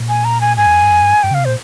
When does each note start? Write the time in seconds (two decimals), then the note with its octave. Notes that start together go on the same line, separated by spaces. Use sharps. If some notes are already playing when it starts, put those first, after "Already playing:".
Already playing: A#2
0.09 G#5
0.25 A#5
0.41 G#5
0.57 G#2 G#5
0.66 E2
0.74 F2
0.83 G2
0.91 F2
1.02 G2
1.23 G2 G5
1.31 C#3 F5
1.39 C3
1.45 A#2 C5